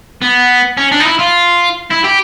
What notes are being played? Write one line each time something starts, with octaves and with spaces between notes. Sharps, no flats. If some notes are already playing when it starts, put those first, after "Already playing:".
B3
C#4
D4
D#4
E4
F4
E4
G4